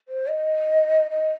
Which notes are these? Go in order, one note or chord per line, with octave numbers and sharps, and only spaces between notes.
C5
D#5
D#5